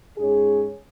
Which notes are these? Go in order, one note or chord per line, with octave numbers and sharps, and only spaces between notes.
G#2 G#3 C#4 G#4